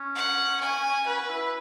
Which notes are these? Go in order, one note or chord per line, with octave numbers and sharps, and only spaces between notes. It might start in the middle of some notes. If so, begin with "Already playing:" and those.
Already playing: C#4
F#5
G#5
F#4 B4
E4